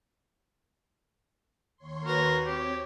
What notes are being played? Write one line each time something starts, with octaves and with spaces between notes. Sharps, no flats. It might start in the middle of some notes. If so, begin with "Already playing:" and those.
D#2 C#5 C6
F#4 A#4 B4
C4 G4 C#5